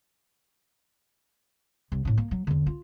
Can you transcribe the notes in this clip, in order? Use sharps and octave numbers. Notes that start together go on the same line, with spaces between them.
C2
A2 D4
A#3
F#3
E2 D3
F4